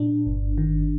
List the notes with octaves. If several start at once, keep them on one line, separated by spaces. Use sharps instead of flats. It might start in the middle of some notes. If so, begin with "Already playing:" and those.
Already playing: A#2 D4
G1
D#3